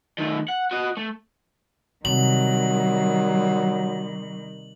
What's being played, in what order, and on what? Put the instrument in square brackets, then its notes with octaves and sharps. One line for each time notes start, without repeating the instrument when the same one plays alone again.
[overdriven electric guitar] D#3 A3
F#5
F#4 D#5
A3
[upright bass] C3 [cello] D#3 G3 [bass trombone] F#3 [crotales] F#7